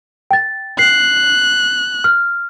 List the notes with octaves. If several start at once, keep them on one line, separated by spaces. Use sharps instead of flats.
G5 A6
F#6 C7
F6